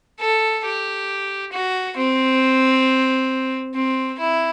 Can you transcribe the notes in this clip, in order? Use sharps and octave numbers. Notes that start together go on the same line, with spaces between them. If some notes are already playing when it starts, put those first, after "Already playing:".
A4
G4
F#4
C4
C4
E4